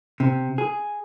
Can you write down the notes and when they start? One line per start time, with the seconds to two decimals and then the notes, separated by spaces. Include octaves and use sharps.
0.20 C3
0.58 G#4